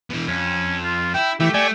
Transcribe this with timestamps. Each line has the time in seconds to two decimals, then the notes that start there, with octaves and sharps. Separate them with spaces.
0.10 B2 E3
0.27 F2 C#4
0.84 F4
1.14 E4 G5
1.40 E3 A3 G4
1.54 A3 D5 G#5